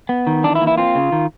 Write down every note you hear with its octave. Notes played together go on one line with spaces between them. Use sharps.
B3
D#3
E3 D4
E4
A#3
E4
C4 F4
C#3
D#3